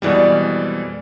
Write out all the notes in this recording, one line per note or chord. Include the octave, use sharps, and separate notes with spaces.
F2 B2 E3 G3 G#3 D5